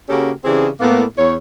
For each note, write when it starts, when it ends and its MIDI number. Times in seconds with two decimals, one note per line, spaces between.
0.09 0.31 49
0.09 0.31 58
0.09 0.31 61
0.09 0.31 66
0.09 0.31 67
0.09 0.31 69
0.45 0.68 49
0.45 0.68 52
0.45 0.68 60
0.45 0.68 62
0.45 0.68 67
0.45 0.68 68
0.80 1.04 45
0.80 1.04 58
0.80 1.04 59
1.17 1.34 40
1.17 1.34 73